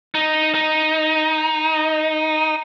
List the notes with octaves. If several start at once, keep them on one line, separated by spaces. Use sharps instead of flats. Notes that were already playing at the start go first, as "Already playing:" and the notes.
D#4
D#4